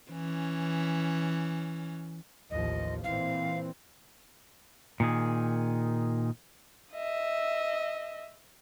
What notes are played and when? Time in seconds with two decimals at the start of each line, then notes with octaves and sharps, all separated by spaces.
0.11 E3 C#4
2.51 A1 D#2 F3 D#5
3.04 A#2 E3 C4 F5
5.00 A#2 D#3 G#4
6.93 D#5 E5